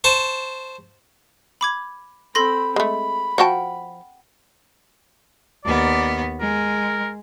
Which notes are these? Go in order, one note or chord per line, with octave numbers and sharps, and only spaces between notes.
C5 A5 C#6
B5 D6 G#6
C4 A4 B5 C6 A#6
G#3 A3 B5
F3 F#4 F#5 G5 A5
D#2 B3 D5
G#3 A#4